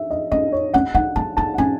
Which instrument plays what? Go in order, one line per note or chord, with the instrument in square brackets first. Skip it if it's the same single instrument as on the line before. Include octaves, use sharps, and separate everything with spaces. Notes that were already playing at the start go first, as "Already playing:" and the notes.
Already playing: [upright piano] E5
D#5
[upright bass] C#4 [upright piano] D#5
[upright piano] C#5
[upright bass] C#4 [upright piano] F#5
[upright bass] D#4 [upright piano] F#5
[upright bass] D#4 [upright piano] A5
[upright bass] E4 [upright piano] A5
[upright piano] F#5
[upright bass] C#4 [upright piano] G#5